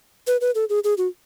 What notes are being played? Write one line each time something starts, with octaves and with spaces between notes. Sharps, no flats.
B4
B4
A4
G#4
G#4
F#4